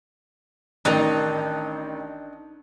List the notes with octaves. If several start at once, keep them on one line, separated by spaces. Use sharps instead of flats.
A1 D#3 D4 D#4 A#5